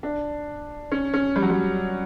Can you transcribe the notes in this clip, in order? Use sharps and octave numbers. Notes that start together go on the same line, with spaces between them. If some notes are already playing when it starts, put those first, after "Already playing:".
D4
C#4
C#4
G3
F#3
G3